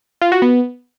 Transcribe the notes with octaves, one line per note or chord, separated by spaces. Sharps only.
F4
F#4
B3